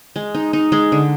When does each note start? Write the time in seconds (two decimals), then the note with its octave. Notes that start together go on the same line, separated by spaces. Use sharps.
0.16 G#3
0.35 D#4
0.53 D#4
0.72 G#3
0.92 D3